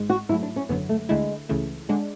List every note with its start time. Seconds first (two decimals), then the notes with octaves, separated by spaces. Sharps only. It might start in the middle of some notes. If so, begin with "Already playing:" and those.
Already playing: G#1 G#2 G#3
0.10 F#4
0.29 G#2 F#3 A3 E4
0.42 D4
0.56 C#4
0.69 G#1 F#2 D3 F#3 B3
0.89 A3
1.09 D2 D3 G#3 A3 E4
1.49 C#2 C#3 E3 A3
1.89 D3 G#3 D4